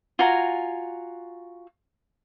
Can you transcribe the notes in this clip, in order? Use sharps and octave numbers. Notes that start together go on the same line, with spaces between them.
F4 F#4 G#5 A#5